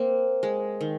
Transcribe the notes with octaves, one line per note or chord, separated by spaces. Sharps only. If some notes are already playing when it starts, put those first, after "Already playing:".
Already playing: A#3 C4
G#3
D#3